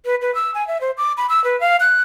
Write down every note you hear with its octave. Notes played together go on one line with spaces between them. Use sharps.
B4
B4
E6
G#5
E5
C5
D6
B5
E6
B4
F5
F#6